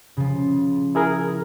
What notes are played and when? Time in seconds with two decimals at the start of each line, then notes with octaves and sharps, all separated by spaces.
0.17 C#3 F3
0.95 E4 G#4 A#4